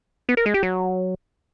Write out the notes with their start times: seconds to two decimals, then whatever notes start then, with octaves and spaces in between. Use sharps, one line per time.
0.29 B3
0.37 A#4
0.46 G#3
0.54 G4
0.63 F#3